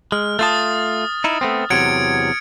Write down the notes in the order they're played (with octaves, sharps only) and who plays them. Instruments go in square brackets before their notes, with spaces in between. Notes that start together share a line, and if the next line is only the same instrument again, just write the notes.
[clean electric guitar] G#3 [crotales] F6
[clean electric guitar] A3 F4 A5 [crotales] D#6 A6
[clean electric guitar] D#4 E4
A3 B3 C4
[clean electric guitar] E2 C3 F#3 [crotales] G#6 C#7 D7